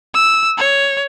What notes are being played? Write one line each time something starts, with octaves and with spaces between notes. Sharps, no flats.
E6
C#5